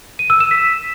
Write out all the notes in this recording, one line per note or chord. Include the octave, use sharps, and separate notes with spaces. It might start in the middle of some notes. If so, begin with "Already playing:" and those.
D#7
E6
E7
B6